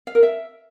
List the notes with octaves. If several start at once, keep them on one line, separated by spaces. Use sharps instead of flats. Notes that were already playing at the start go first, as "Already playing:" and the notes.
F5
A#4
E5